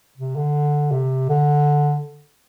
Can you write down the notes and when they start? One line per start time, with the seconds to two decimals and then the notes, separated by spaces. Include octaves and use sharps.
0.18 C3
0.36 D3
0.92 C3
1.29 D3